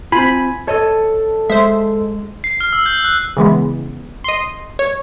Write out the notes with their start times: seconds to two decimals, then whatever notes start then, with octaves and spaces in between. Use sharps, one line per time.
0.12 C4 F4 G#5 B5
0.68 A4 C#5 D#5 A5
1.50 G#3 C5 E5
2.44 C7
2.60 F6
2.73 E6
2.86 G6
3.05 F#6
3.37 C#3 E3 G#3 B3
4.24 D#5 C6
4.79 C#5